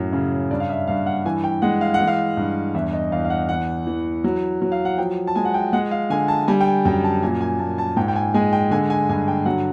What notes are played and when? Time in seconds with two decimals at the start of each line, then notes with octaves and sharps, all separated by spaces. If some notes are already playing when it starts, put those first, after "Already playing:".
Already playing: F#2 A2
0.13 C#3
0.51 G2 D5
0.60 F5
0.69 E5
0.87 G2 F5
1.06 F#5
1.25 E3 G#5
1.44 G5
1.62 G#3 F#5
1.81 F5
1.94 F#5
2.00 E3
2.07 F5
2.37 G2
2.74 E2 E5
2.93 D#5
3.12 E2 F5
3.25 F5
3.30 F#5
3.49 E3 F#5
3.87 E3
4.24 F#3
4.62 F#3
4.72 F5
4.85 F#5
4.98 F3 G5
5.27 A5
5.35 G#3 G#5
5.45 F#5
5.54 G5
5.73 G#3 F#5
5.91 F5
6.10 D3 G#5
6.28 A5
6.48 G3 G#5
6.61 G5
6.66 G#5
6.85 F#2 G5
7.04 A5
7.23 A#2 G#5
7.41 G#5
7.59 A#2 A5
7.78 A5
7.96 G#2 G5
8.08 G5
8.15 G#5
8.34 G#3 G#5
8.53 G5
8.71 D3 G#5
8.90 G#5
9.09 G2 G#5
9.28 G5
9.45 F#3 F#5